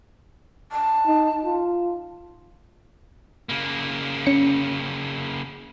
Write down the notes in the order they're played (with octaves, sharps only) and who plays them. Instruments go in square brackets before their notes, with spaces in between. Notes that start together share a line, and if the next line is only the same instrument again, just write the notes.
[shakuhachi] A5
[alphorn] D#4
F4
[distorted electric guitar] C#3 A#3
[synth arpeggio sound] C#4 C#7